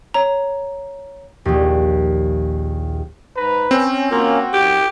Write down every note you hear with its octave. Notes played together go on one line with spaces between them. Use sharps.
C#5 A#5
A#1 D#2
G#2 B4 A#5
C4 C#4
A#3 C#4 F4 F#4 A#4
F#2 G4